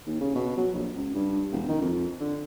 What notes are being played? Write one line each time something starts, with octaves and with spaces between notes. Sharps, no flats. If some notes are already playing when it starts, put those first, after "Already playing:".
D#2
C#3
B2
F#3
A#1
C#2
G2
E1
D#3
F2
D3